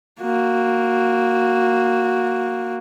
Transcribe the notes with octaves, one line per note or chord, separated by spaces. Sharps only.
A#3 F#4